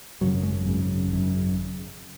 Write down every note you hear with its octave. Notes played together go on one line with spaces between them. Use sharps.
G#1 F#2 C#3 F#3
G#3
G#1 F#2 C#3
G#1 F#2 C#3